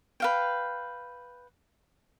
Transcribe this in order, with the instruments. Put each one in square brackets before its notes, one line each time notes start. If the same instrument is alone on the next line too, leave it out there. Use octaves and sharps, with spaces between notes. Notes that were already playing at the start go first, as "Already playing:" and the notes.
[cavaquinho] B4 F5 G5